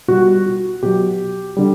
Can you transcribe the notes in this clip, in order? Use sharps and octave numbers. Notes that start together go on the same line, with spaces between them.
B2 G3 F#4
F#4
B2 F#3 G4
D3 G3